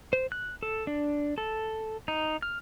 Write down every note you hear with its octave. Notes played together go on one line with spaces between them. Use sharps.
C5
F#6
A4
D4
A4
D#4
F6